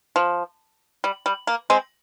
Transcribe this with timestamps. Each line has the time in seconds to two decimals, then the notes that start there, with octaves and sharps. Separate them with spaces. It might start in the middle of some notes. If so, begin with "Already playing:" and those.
0.16 F3
1.04 G3
1.26 G3
1.47 A#3
1.70 G#3 C4